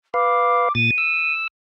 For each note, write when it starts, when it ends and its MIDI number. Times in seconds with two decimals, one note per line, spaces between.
0.14 0.69 71
0.14 0.69 77
0.14 0.74 86
0.75 0.90 46
0.75 0.90 93
0.75 1.33 99
0.98 1.48 88